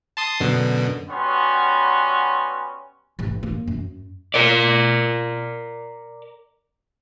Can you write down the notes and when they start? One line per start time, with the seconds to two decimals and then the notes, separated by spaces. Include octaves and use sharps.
0.17 A5 C6 D#6
0.40 F#2 B2 D3
1.10 G3 B3 C#4 F#4 C6
3.19 A1 G2
3.43 A#3
3.67 F#2
4.34 A#4 D5